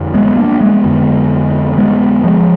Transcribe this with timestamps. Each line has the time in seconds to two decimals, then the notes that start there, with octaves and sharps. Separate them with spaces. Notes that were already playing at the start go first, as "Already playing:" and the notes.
Already playing: F2 D3
0.14 G#3 B3
0.37 A#3 D4
0.60 G#3 B3
0.84 F2 D3
1.78 G#3 B3
2.24 F3 G#3